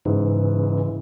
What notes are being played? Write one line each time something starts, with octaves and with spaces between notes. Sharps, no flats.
G#2 C#3 E3